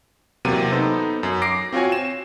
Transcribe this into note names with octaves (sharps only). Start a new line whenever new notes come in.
E2 C3 F#3 A#3 D#7
B3 D#4 A4 C5
F#2
D6 A#6 C7 D7
C4 F4 F#4 C#5 G#5
E7